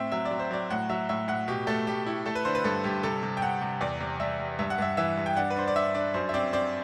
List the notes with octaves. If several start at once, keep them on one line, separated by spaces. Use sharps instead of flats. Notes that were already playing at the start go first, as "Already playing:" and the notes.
Already playing: A2 C4 E5
F#3 E5
D5
F#3
C5
F#3 D5
A2 F#5
F#3 E5
A2 E5
A2 F#5
B2 G4
A3 A4
A3 G4
E4
A3 A4
B4
D3 C5
B4
G2 A4
G2 G4
C3 A4
C3
G5
C3 F#5
C3
E2 D5
C3
G3 E5
G3
G2 E5
F#5
G2 E5
E3 E5
G2
G5
D4 F#5
B4
D4 C5
D5
D4 E5
D4 D5
F#2 C5
E5
C4 D5
C4 D5